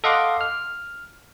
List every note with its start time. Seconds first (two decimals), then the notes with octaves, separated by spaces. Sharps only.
0.04 A4 D#5 F5 F#5 C6 D6
0.41 F6